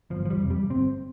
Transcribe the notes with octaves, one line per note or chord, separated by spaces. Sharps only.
G1 F3
F3
G3
F2 C3
G3
G1 C4